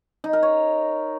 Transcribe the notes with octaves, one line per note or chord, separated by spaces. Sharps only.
D#4
A#4
C#5